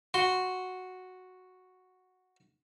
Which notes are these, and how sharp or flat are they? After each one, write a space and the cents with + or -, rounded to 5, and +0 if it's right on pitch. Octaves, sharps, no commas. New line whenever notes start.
F#4 -5 C6 +0